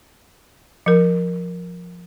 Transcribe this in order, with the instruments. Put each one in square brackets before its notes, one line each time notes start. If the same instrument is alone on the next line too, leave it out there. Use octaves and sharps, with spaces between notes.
[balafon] F3 A#4